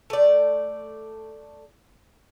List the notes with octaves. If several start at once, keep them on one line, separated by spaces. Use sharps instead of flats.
A3 D5